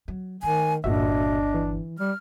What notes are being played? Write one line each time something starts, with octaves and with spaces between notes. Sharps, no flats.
F#3
D#3 A3 G#5
G1 D2 A#2 D4 F#4 D#5 E5
E3
G3 F6